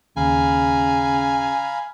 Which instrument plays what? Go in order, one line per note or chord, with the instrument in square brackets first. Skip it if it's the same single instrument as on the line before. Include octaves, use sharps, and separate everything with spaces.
[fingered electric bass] D#2 [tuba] C#3 [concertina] F5 A#5 B5 [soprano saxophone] G#5